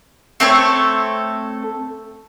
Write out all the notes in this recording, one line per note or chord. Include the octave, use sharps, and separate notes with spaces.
A3 C4 A4 C#5